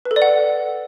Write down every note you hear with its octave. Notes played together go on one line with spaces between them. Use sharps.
B4
A4
D5
F#5